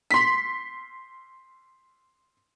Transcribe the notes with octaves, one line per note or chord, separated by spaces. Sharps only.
C6 B6